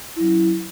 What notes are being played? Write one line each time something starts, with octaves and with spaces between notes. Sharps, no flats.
F#3 C#4 E4